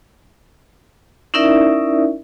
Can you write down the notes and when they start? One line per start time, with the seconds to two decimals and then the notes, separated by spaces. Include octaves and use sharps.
1.34 C#4 D#4 E4 A#4 D5 E5